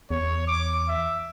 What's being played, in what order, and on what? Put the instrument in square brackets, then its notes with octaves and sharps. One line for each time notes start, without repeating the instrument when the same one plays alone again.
[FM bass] E2 [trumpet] C#5
[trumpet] D6
E5